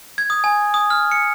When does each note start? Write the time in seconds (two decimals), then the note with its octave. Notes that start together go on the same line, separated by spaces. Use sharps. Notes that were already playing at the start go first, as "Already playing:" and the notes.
0.18 G#6
0.30 D#6
0.44 G#5
0.74 D#6
0.90 F6
1.12 C#7